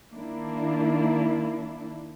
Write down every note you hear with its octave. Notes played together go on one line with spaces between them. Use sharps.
D#3 A#3 D4 E4